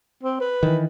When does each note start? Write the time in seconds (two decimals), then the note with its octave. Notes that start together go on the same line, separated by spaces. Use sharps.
0.23 C4
0.41 B4
0.63 D#3 E3